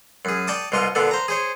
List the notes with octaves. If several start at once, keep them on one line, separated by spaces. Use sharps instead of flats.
F#2 G#4
D5 G5 A5 C#6 D#6
C2 B2 F4 D#5 C#6
A#2 D3 B3 A4
C5 A#5
G#4 C5 C#5